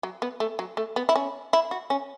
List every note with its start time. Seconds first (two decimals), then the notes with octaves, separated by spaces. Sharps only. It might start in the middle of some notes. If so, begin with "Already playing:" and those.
0.03 F#3
0.22 B3
0.40 A3
0.59 F#3
0.77 A3
0.96 B3
1.09 E4
1.16 C#4
1.53 E4
1.71 F#4
1.90 C#4